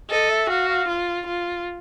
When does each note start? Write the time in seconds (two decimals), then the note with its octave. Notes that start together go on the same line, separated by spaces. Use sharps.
0.10 A4 D#5
0.30 E5
0.50 F#4 F5
0.69 F5
0.88 F4
1.27 F4